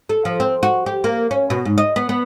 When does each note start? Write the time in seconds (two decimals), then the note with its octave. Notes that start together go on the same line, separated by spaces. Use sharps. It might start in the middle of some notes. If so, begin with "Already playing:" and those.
0.09 A4
0.25 F3
0.40 C4
0.63 F#4
0.86 G4
1.04 A#3
1.31 C#4
1.50 B2
1.65 G#2
1.78 D#5
1.96 B3
2.09 B3